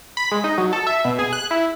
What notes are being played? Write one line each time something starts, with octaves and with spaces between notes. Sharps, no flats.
B5
G#3
D#4
F#3
A4
E5
B2
G#4
F#6
E4